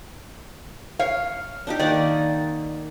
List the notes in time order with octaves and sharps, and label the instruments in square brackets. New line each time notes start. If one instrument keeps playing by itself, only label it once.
[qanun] C#5 [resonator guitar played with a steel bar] F5
[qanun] D4 D#4 G4
[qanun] D#3 A#3 F#5 [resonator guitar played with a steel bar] D5